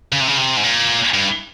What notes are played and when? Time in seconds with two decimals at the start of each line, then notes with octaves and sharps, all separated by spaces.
0.12 C#3
0.21 C3
0.28 C#3
0.38 C3
0.57 G#2
0.63 A#2
1.14 G2